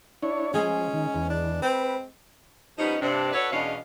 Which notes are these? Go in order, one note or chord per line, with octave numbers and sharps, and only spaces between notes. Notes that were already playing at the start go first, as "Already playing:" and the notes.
D4 E4 C#5
F3 G#3 C#4 G#4
D#3
E2
D4
C4 B4
F3 G3 B3 C#4 D#4
G2 C3 D4
D4 F#4 A4 B4 C#5
E2 B2 G#3 C#4 D4 F5